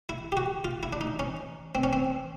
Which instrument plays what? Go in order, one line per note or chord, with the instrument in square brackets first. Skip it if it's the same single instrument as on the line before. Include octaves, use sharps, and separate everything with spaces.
[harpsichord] E4
G4
F#4
F4
E4
D4
D#4
C#4
C4
C#4
C4